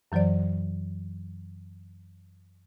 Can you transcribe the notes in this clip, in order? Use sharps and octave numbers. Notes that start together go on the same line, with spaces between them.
F#2 E3 F#3 C5 D5